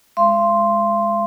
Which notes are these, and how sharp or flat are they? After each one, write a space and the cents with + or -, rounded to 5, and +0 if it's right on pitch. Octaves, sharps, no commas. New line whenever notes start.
G#3 +0 F5 -40 C6 +0